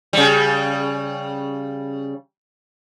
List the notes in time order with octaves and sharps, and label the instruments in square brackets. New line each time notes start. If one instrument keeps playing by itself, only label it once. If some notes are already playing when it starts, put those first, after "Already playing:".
[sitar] C#3 G3